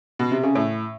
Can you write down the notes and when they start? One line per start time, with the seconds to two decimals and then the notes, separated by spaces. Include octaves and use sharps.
0.19 B2
0.31 C3
0.43 C#3
0.55 A2